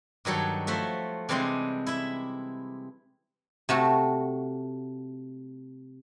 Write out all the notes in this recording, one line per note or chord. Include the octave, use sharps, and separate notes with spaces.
G2 D#3 F#3 A4 C#5
F3 A3 F#4 E5
C3 E3 G3 G#3 C4 D4
E4 E5
C3 A3 F#4